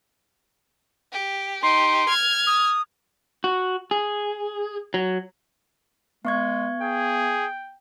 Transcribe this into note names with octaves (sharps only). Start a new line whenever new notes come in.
G4
D#4 G4 C6
F6 G#6
D#6
F#4
G#4
F#3
G#3 B3 C#6 G#6
G#4 G5